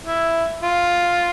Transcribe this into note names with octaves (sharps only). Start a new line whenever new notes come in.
E4
F4